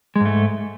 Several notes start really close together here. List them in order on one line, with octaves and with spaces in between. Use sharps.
G#3 G#2 A3